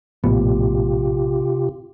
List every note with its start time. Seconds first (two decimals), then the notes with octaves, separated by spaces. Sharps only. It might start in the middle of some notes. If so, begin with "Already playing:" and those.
0.24 A#1 A2 C3 B3 F4 G4